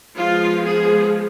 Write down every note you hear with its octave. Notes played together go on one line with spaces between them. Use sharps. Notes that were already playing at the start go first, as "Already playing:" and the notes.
F3 G#3 B3 F4
G#4